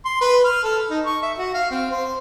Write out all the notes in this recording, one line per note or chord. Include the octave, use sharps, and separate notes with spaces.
C6
B4
F6
A4
D#4
C#6
E5
F#4
F5
C4
C5